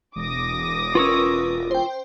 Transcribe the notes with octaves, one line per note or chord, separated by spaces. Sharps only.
E1 D6 D#6 A#6
C#4 F4 A#4 B4 C#6 E6
C5 G5